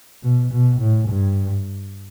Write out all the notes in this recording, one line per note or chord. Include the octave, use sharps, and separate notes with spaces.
B2
B2
A2
G2